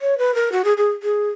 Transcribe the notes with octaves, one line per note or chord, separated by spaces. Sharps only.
C#5
B4
A#4
F#4
G#4
G#4
G#4